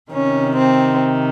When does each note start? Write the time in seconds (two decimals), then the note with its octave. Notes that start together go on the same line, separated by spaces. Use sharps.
0.12 C3 D#3 C#4
0.57 C4